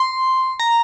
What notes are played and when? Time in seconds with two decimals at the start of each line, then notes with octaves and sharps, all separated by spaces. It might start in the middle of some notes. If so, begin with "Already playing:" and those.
Already playing: C6
0.60 A#5